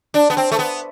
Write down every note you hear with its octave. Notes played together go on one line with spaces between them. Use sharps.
D4
B3
C4
A3
B3